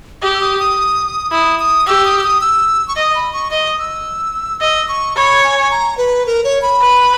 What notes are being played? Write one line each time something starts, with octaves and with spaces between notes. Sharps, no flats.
G4 D#6
E6
D#6
D#6
E4 D#6
D#6
G4 E6
D#6
E6
D#6
E6
C#6
D#5 D#6
B5
C#6
D#5 D#6
E6
D#5 E6
C#6
C#5 B5
G#5
G#5
A#5
B4
A#4
C#5
B5
B4